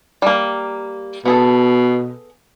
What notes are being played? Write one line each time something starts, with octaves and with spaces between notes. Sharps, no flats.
G3 A#3
B2 B3 G#4 A4